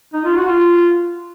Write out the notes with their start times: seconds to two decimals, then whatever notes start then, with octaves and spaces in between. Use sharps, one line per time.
0.13 D#4
0.25 F4
0.36 F#4
0.48 F4